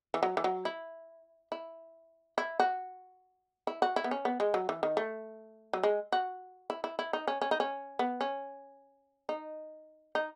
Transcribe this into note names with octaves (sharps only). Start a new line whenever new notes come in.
E3
F#3
E3
F#3
E4
E4
E4
F#4
E4
F#4
E4
B3
C#4
B3
G#3
F#3
E3
D#3
A3
F#3
G#3
F#4
E4
E4
E4
D#4
C#4
C#4
D#4
C#4
B3
C#4
D#4
D#4